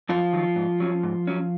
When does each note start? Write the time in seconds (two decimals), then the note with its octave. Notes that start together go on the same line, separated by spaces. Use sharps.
0.09 F#2 F3 F4
0.33 D#3 F#3
0.56 G#2
0.80 F#3 C#4
1.03 G#2
1.27 F#3 C#4